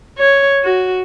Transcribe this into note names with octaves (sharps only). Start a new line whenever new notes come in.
C#5
F#4